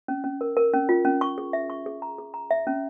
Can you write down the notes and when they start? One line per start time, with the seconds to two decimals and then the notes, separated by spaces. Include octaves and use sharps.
0.08 C#4
0.24 C#4
0.41 A#4
0.57 A#4
0.74 C#4
0.89 F4
1.05 C#4
1.21 C#6
1.38 G#4
1.53 E5
1.70 C#6
1.86 G#4
2.02 A#5
2.18 G#4
2.34 A#5
2.51 E5
2.67 C#4